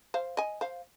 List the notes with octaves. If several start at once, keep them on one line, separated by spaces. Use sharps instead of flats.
C5 F5
D#5 G#5
C5 F5